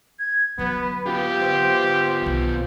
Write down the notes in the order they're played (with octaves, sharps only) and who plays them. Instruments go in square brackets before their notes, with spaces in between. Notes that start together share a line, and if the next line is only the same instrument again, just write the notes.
[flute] G#6
[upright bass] D3 F#3 [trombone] B3 [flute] B4
[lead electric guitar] B3 F4 [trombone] G4
[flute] C5
[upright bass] B1 D#3